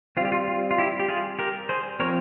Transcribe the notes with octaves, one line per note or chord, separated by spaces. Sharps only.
G3 C4 F4 G4
F4
F4
F4
E4 G4
G4
F4 G#4
G4 A#4
G#4 C5
F3 C4 A#4 C#5